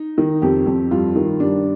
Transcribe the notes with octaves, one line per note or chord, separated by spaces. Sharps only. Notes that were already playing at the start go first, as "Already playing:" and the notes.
Already playing: D#4
D#3
F2 G4
F2
G2 F4
D#3
G2 D4